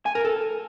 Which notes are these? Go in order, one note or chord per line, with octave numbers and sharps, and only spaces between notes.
G#5
A#4
A4